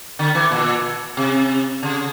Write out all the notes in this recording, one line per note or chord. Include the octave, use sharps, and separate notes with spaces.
D3
E3
A#2
C3
C#3